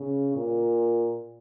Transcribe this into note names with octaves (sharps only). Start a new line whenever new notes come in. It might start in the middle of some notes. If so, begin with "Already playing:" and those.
Already playing: C#3
A#2